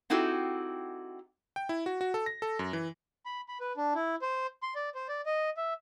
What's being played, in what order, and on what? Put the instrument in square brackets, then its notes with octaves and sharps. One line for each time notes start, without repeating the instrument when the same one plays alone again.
[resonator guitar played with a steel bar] C4 D#4 E4 F#4 G4 A4
[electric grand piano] G5
E4
F#4
F#4
A4
A#6
A4
F#2
E3
[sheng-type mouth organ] B5
B5
B4
D4
E4
C5
C6
D5
C5
D5
D#5
E5